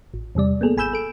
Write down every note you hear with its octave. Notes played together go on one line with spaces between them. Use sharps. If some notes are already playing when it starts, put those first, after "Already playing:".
A1
E2 C3 G3 D5
A#3 B3 G#4 A4
G#1 G#5 B5 E6 G6 E7
A4 D7